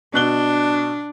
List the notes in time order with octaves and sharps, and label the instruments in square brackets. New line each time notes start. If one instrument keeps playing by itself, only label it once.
[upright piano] B2 F#6 G7 [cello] D4